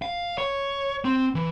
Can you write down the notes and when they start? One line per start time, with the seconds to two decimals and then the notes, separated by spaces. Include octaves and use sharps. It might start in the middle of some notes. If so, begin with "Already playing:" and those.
0.02 F5
0.38 C#5
1.05 C4
1.35 E3